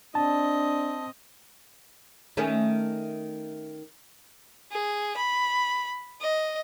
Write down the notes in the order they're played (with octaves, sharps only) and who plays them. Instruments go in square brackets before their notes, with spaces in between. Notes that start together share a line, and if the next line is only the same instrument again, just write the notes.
[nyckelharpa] C4 D#5 [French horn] D4 [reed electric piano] A5
[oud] D#3 A3 C#4
[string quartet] G#4
B5
D#5